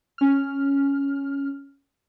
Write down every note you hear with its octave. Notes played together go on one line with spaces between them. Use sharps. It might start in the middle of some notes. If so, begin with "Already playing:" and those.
C#4 F6